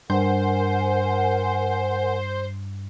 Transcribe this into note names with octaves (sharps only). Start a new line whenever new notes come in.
G2 A#4 C5 F#5 G#5